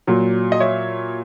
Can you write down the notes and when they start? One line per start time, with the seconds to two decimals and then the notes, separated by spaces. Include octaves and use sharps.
0.07 A#2 F#3
0.52 D#5
0.60 C#5 E5